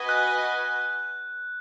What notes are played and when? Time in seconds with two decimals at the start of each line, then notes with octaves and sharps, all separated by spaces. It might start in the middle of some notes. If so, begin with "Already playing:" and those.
Already playing: F#4 B4 D#5 G#5
0.09 F#6